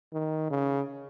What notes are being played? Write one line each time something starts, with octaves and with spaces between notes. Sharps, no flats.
D#3
C#3